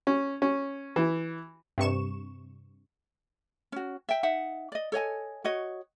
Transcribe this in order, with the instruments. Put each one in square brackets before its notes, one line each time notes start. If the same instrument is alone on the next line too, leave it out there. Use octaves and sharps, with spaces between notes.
[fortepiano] C#4
C#4
E3
[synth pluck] G2 C3 C#6 E7
[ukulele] C#4 F#4
E5 G5
D#4 E5 F#5
D5 D#5
A4 C#5 D#5 G#5
F#4 C#5 D#5